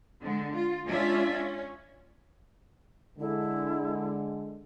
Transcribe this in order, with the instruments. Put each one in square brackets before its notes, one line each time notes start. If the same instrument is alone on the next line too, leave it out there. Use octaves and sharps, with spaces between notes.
[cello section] D3 G#3
F4
G#3 C#4 D4 F4 E5
C#4
[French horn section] D3 G#3 [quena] E4